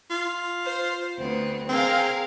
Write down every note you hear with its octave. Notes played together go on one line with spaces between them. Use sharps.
F4
C5
D2 B3 C4
C4 G#4 A#4 F5